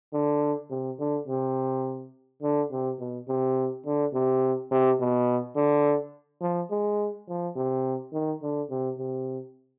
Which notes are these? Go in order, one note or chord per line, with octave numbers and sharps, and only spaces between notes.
D3
C3
D3
C3
D3
C3
B2
C3
D3
C3
C3
B2
D3
F3
G#3
F3
C3
D#3
D3
C3
C3